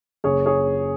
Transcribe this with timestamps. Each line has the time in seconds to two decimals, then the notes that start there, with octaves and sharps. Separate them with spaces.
0.24 F#1 G#4 C#5
0.46 G#4 C#5